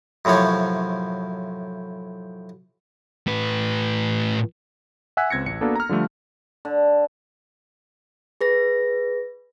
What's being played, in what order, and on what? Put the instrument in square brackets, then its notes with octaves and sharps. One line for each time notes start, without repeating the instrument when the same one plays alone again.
[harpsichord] F#2 A2 C3 F3 C#5
[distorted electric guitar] A2 B4
[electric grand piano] E5 F#5 G#5 E6 F#6 B6
C#2 C4 G#6 A#6 C#7
A1 C#7
A#3 B3 D4 F#4 A4 A#4
A#5 F6
D3 F3 G3 A3
[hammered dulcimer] D3
[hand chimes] G#4 B4 A#6